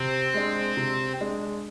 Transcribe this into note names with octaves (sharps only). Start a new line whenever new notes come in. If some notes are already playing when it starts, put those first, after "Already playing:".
Already playing: C3 C4
G#3 D4
C3
G#3 D4